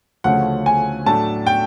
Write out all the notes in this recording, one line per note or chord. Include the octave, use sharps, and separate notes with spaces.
D2 C#3 F3 A3 C#4 F#5
G#5
A2 F#3 A3 D4 A5
G5